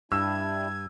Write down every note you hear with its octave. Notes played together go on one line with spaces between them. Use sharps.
G2 G3 D4 E4 E6 G#6